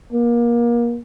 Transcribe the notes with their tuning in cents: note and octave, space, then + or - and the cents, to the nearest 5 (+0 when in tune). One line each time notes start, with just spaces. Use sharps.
A#3 +30